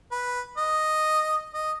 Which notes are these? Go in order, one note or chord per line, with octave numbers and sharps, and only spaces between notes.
B4
D#5
D#5